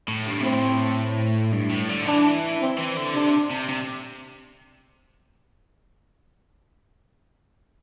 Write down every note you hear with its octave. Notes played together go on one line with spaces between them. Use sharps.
A2
G2
C3
A2 C4
G2
A2
D3
E3 D4
C4
E3
D3
C3 D4
C3
C3